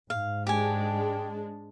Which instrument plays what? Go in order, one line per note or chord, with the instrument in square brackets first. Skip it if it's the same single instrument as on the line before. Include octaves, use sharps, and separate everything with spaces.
[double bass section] G#2 [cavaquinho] F5
[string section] G#3 D4 [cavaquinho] G4 G#5